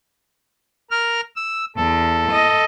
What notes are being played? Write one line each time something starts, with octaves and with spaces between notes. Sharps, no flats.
A#4 F6
E6
E2 A4
D#5